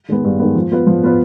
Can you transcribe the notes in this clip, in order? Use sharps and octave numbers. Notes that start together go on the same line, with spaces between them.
D#3 G#3 B3
G2
D#3 G#3 B3
F3
B3 F4 B4
F3
B3 F4 B4